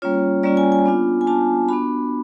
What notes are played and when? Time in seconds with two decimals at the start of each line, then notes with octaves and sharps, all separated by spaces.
0.02 G3 A#3 C#4 F4 C#5
0.43 G3 A#3 C#4 F4 D5
0.57 G#5
0.72 G#5
0.86 B3 D4 F4
1.21 G#5
1.27 B3 D4 F4 A5
1.68 B3 D4 F#4 B5